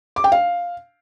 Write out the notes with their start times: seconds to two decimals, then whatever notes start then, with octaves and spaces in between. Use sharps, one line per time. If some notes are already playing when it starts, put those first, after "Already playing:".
0.16 D6
0.24 G5
0.32 F5